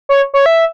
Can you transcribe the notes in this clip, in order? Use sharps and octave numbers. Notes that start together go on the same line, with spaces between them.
C#5
C#5
E5